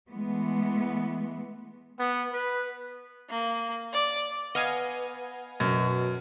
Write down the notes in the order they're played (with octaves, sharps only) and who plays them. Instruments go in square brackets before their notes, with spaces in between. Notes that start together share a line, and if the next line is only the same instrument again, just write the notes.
[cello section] E3 G#3 A3 B3
[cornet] B3
B4
[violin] A#3
D5
[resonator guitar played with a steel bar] B3 [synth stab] D#5 F5 G#5
[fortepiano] F#2 [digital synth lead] B2